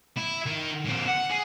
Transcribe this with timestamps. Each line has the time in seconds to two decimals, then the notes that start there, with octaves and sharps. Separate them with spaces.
0.17 E4
0.46 D#3
0.86 A#2 C4
1.08 F#5
1.31 G#4